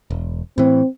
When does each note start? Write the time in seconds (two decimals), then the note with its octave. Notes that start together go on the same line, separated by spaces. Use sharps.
0.10 E1
0.58 A2 E3 C4